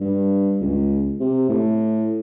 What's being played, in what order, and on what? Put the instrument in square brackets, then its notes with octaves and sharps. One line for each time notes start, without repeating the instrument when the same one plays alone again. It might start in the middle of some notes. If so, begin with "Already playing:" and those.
[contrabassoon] G2
C#2
C3
A2